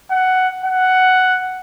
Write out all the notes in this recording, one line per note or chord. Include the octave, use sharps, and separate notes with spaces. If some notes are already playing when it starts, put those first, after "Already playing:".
F#5
F#5